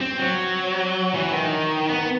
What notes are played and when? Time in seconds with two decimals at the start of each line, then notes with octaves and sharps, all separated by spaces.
0.01 C4
0.19 F#3
1.13 E3
1.33 D#3
1.89 B3